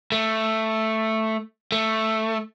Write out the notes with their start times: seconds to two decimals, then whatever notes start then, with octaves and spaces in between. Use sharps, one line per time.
0.12 A3
1.72 A3